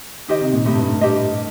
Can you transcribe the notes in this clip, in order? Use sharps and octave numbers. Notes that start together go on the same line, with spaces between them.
D#3 D#4 G4 C5 D#5
C3
A#2
A2 D#4 G4 C5 D#5
G2
A2
G2
D#4 G4 C5 D#5